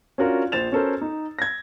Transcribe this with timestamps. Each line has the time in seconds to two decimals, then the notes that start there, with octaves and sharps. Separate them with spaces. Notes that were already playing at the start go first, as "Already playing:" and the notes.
0.18 C#4 D4 F4 F#4 A#4
0.52 A#1 C5 A6 E7 F7
0.72 C#4 F#4 A4 A#4 C5
1.01 D#4
1.39 G#6 A#6